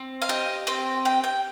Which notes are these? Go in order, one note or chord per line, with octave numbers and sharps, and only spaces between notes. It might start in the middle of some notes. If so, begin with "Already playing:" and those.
Already playing: C4
F5
G4 D#5
C4 G5
G4 G5
G5